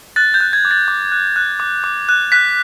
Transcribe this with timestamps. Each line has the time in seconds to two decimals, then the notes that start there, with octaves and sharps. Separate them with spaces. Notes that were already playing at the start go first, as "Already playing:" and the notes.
0.16 F#6 A6
0.34 G6
0.40 F#6
0.53 G#6
0.65 D6
0.71 A6
0.88 D6
1.12 F#6
1.36 F#6
1.60 D6
1.84 D6
2.09 F#6
2.32 F#6 B6